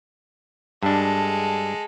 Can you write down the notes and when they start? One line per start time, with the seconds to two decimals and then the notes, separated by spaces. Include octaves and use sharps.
0.83 G2 G#3 D4 A4